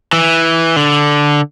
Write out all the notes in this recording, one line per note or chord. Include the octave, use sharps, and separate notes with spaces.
E3
D3